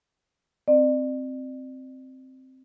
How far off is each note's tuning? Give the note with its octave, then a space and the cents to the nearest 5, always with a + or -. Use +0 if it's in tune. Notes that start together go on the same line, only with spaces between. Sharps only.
C4 +0 D5 +35